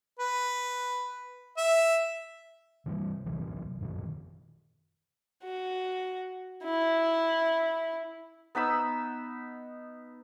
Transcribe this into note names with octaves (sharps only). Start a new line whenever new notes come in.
B4
E5
C3 E3 F3 G3
B1 C3 E3 F#3
F#2 A#2 D3 D#3
F#4
E4
B3 D#4 B5 E6